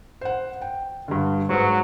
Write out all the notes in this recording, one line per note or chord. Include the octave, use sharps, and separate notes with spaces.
C5 F#5
G5
G2 D3
G#2 F#3 B4